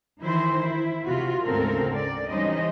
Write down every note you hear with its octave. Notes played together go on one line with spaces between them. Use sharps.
D#3 E3 E4 C5
E4
C3 F4 F#4
D2 G#2 C#3 C4 A4 A#4
D5
E3 G3 C#4 D#4 C5 D#5